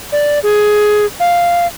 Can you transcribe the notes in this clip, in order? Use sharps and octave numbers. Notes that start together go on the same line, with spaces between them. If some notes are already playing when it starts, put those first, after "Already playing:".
D5
G#4
F5